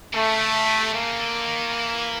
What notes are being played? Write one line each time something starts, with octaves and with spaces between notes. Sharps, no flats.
C#3 A3
C#3
C3
C#3 A#3
D3
D#3
E3